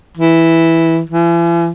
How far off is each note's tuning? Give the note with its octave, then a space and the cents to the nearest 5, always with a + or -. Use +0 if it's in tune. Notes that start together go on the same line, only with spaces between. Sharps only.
E3 -5
E3 +45